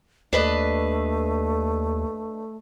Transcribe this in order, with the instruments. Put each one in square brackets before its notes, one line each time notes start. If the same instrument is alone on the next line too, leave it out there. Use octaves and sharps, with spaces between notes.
[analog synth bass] D#2 [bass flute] A3 [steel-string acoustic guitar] D4 B4 D#5